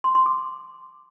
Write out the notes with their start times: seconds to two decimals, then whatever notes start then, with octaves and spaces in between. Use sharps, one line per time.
0.04 C6
0.15 C6
0.26 D6